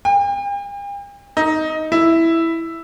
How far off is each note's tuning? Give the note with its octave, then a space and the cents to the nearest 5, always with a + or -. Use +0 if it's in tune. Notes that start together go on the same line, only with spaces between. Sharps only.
G5 +45
D#4 +10
E4 +0